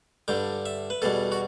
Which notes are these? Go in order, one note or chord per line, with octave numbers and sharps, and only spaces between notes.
G2 D3 G3 G5
E5
B4
E2 B2 G3 A4
F#4